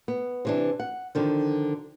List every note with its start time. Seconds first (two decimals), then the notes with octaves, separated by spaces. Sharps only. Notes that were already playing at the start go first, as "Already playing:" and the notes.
0.08 B3
0.45 C3 E3 D4
0.80 F#5
1.15 D3 D#3 F3